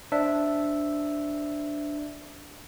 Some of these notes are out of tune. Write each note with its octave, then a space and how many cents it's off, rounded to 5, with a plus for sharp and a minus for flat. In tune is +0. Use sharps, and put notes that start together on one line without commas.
D4 +0 C5 +0 E5 +0